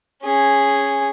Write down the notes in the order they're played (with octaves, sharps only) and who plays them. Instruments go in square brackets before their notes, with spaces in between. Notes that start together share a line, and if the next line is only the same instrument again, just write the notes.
[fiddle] C#4 G#4